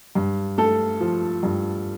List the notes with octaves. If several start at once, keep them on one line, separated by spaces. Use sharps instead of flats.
G2
A3 A4
F3
G2